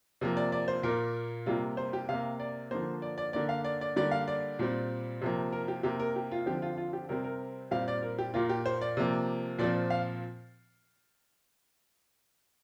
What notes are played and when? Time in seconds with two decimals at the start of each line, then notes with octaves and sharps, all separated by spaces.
0.21 C3 F3 A#3
0.37 D5
0.52 D5
0.68 C5
0.83 A#2 A#3 A#4
1.46 C3 G3 A#3 F4
1.77 C5
1.93 G4
2.09 C3 A#3 F5
2.40 D5
2.71 D3 F3 A#3 C5
3.02 D5
3.18 D5
3.33 D3 A#3 D5
3.49 F5
3.65 D5
3.81 D5
3.96 D3 G3 A#3 D5
4.11 F5
4.28 D5
4.59 A#2 G3 C4
5.21 C3 F3 A#3
5.53 A#4
5.68 G4
5.83 C3 A#3 G4
6.00 A#4
6.16 G4
6.31 F4
6.46 D3 F3 C4 G4
6.62 F4
6.78 F4
6.93 G4
7.09 C3 G3 C4 A#4
7.24 A#4
7.71 A#2 G3 C4 F5
7.88 D5
8.02 A#4
8.19 G4
8.34 A#2 A#3 F4
8.49 G4
8.66 C5
8.81 D5
8.97 C3 F3 A#3
9.59 A#2 F3 C4 D5
9.90 F5